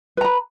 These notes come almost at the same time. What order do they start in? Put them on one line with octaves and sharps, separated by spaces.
B4 A#5 B5